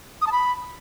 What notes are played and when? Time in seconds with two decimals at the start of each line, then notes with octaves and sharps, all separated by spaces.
0.22 D#6
0.27 A5
0.32 B5